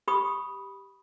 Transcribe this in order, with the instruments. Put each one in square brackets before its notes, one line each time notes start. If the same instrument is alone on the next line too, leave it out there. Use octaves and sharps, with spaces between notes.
[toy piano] G4 B5 C#6 D#6